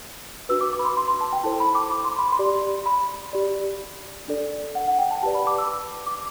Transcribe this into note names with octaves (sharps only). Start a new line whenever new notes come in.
D4 F#4 B4 E6
D6
D6
B5
C6
C6
C6
A5
G5
E4 A4 C5 A5
B5
D6
D6
C6
B5
C6
G4 D5
B5
G4 D5
D4 A4 D5
F#5
F#5
G5
A5
G4 B4 D5 A5
B5
D6
E6
D6